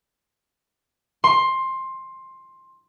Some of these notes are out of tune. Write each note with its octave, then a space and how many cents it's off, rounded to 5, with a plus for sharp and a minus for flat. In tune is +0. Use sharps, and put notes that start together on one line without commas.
C6 +15